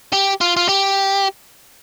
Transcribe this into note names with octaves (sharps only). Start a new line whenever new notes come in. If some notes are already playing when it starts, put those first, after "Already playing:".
G4
F4
F4
G4